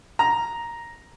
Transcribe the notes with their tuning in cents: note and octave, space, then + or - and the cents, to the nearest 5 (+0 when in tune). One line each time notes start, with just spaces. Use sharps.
A#5 +5